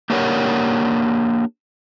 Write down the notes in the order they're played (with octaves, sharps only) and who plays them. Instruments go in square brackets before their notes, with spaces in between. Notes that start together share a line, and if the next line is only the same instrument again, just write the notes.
[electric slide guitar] A#3 D4 G4 A#4 C#5 F#5